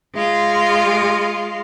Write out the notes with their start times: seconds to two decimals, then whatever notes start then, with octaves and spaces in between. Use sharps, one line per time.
0.14 G#3 F4